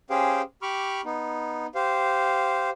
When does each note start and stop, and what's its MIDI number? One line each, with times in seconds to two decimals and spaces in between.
0.10 0.42 61
0.10 0.42 67
0.10 0.42 68
0.10 0.42 72
0.10 0.42 77
0.10 0.42 79
0.62 1.01 67
0.62 1.01 83
0.62 1.01 85
0.62 1.01 86
0.62 1.01 89
1.05 1.66 59
1.05 1.66 63
1.75 2.70 67
1.75 2.70 72
1.75 2.70 77